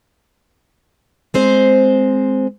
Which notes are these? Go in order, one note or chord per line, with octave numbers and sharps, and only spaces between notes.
G#3 C4 C5